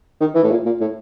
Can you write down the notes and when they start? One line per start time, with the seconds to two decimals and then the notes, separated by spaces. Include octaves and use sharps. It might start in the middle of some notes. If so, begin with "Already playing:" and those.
0.21 D#3
0.35 E3
0.44 A2
0.51 A#2
0.65 A#2
0.81 A2